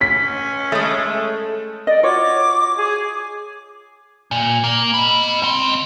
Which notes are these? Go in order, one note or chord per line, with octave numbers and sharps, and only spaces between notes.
C#4 B6
G#3 A3
D5 D#5
F4 F#4 C#5 D6
G#4
A#2
A#3
D#5 B5
C#2 C4